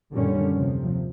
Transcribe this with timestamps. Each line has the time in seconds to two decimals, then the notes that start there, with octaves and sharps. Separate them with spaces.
0.12 F#2 A#2 D3 D#3 G3 C#4
0.54 D#2 C3 F3